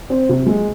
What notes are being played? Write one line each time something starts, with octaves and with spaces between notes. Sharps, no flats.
C4
C3
G#3